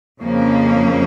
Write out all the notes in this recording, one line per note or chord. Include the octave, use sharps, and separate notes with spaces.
F2 C#3 F3 A#3